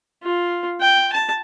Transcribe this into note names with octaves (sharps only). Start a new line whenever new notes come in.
F4
G5
A5